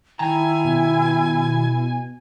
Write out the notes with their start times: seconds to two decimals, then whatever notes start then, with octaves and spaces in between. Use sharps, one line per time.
0.19 D#3 E4 G5 G#5 A#5
0.65 B2